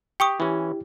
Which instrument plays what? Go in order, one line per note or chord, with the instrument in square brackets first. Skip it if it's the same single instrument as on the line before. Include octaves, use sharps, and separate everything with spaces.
[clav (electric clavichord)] G4 [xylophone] G5 C#6 D#6
[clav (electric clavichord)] E3 C#4 [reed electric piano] E4 G4